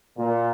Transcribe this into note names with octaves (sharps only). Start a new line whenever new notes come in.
A#2